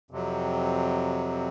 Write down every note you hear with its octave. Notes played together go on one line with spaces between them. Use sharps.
F2 C3 F#3